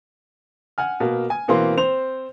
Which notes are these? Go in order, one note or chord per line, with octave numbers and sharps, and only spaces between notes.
F#5 G#5 F6
B2 A#3
G#5
B2 E3 A#3 C4 C6
C4 C5 F7